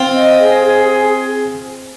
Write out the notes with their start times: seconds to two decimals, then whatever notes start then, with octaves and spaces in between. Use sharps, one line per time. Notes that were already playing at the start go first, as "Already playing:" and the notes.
Already playing: C4 F4
0.14 D#5
0.38 G#4
0.62 G#4
0.86 G#4